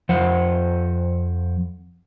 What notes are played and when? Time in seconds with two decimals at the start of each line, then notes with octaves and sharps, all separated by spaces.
0.09 F2 F3 C5 F#5